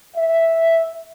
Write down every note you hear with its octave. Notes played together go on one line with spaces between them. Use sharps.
E5